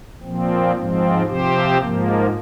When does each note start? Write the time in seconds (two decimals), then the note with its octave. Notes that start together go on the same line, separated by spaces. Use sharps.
0.22 A#2 F3 C4
0.74 G#2 F3 C4
1.26 C3 F3 C4 G4 C5
1.78 G#2 F3 A#3